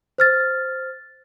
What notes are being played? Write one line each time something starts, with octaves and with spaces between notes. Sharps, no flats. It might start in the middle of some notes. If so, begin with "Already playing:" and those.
C5 F6 A6